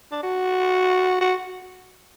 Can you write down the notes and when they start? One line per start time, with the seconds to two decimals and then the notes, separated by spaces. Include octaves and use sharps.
0.12 D4
0.23 F#4
1.21 F#4